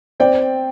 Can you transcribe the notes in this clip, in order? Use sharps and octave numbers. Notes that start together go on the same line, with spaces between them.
C4 D5 G5